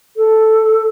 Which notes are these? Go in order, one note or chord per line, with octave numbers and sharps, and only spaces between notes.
A4